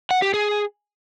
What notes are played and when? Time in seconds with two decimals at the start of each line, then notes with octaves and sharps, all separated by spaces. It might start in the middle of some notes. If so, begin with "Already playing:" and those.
0.11 F#5
0.22 G4
0.34 G#4